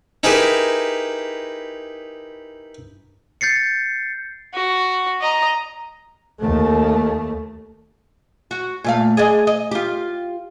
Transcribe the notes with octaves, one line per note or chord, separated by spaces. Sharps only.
D#4 E4 G4 G#4 A#4 B4
G6 A6 C7 C#7
F#4
D#5 A#5
D#2 A3
F#4
A#2 A3 F5
G#4 D5 D#5
D#5
F4 G4